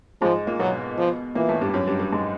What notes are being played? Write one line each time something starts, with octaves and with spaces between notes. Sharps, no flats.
G#2 F3 G#3
A#2 A#3
B2 F#3 B3
F3
A#2 E3 A#3
A2 A3
G2 G3
F#2 F#3
G2 G3
G2 G3
G#2 G#3